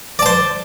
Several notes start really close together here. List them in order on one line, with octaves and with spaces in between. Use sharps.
D5 A5 C5